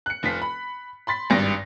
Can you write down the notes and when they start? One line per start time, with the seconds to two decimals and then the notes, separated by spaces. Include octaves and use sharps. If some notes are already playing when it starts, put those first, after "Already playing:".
0.06 F#6 C#7
0.23 F1 F3 F4 B6
0.42 B5
1.07 B5 C6 A6 B6
1.30 G#1 G2 A#6